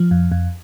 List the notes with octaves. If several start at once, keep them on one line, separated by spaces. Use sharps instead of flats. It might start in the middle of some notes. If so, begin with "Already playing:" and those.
Already playing: F3
F2
F2